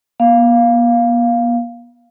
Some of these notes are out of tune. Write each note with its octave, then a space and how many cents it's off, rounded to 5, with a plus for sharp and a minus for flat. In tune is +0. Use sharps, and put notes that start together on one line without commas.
B3 -45 F5 +0